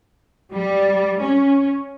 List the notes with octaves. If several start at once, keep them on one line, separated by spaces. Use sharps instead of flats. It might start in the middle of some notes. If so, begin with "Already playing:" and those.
G3
C#4